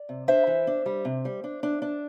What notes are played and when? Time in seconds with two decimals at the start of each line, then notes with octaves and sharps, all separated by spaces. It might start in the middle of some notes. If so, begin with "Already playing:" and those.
Already playing: D5
0.09 C3
0.28 D4 C5 E5
0.47 E3
0.67 D4
0.86 G3
1.05 C3
1.25 G3
1.44 D4
1.63 D4
1.82 D4